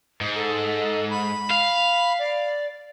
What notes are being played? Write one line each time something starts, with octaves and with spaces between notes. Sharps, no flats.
G#2
A4
B5
F5
D5